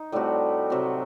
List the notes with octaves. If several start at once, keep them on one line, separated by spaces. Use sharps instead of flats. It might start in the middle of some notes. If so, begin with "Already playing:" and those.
Already playing: D#4
A2 G3 C4 F#4
C3 F#3 C4